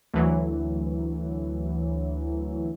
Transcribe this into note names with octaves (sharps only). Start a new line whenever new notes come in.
D2 E3 F#3